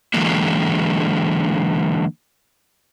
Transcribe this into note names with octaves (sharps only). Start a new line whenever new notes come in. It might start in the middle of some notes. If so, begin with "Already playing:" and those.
D3 E3 F#3 G#3 A#3